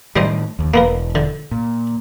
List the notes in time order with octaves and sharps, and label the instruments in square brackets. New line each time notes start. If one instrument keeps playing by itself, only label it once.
[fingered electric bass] A2 D#3 [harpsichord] G3 C5 D#5
[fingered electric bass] D#2
[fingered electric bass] E1 [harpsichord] A#3 B3 A#4
[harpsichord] D3
[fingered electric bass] A#2